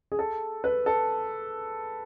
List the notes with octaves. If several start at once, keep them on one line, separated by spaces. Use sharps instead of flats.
G#4
A4
B4
A4